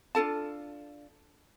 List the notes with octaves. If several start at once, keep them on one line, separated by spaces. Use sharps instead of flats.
D4 F4 A4 A5